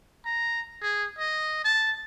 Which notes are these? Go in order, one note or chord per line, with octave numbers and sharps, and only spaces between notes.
A#5
G#4
D#5
A5